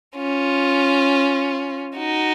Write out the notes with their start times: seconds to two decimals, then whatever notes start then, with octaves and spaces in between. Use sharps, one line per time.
0.17 C#4 F4
1.97 D#4 F#4